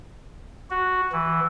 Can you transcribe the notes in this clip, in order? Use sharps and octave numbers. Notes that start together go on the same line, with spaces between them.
F#4
E3